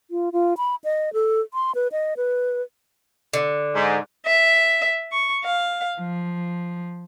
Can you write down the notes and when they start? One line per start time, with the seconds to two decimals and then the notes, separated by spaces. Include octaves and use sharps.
0.11 F4
0.33 F4
0.57 B5
0.84 D#5
1.13 A4
1.54 C6
1.75 B4
1.92 D#5
2.17 B4
3.33 D3
3.75 G#2
4.27 E5
5.13 C#6
5.45 F5
5.99 F3